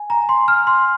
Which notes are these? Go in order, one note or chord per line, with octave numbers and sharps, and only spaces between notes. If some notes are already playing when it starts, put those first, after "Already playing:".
Already playing: G#5
A#5
C6
F6
C6